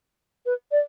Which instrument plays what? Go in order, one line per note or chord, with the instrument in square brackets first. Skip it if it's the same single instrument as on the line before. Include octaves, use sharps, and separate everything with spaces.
[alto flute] B4
D5